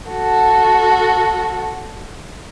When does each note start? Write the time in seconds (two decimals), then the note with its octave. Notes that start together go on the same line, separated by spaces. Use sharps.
0.11 F#4 A4